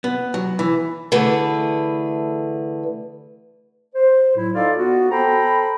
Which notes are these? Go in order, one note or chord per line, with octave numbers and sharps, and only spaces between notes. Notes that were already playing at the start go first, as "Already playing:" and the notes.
B3
F#3
E3
D3 E3 A3 G#4 B4
C5
A2 F#3 E4
D#4 F4 A4 D5 F5
B3 F#4
A4 C5 G5 A#5 B5